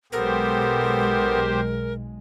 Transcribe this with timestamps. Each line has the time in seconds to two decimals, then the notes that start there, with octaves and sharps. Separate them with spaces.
0.12 B1 G#3 B3 G4 A4 A#4 C5